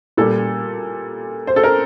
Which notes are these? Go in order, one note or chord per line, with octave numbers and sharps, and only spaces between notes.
A#2 G3 A4
C5
A4
A#4